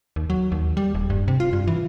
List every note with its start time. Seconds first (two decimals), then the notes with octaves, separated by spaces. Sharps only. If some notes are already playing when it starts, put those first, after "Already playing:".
0.16 D#2
0.30 F#3
0.52 D#2
0.77 G3
0.95 D#1
1.10 G2
1.28 C3
1.40 F4
1.53 G2
1.68 E3